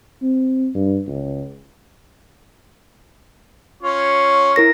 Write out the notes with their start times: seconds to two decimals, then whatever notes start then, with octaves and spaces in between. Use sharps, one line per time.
0.22 C4
0.75 G2
1.07 C#2
3.83 C#4 F4 C#5
4.56 E4 A#4 A#6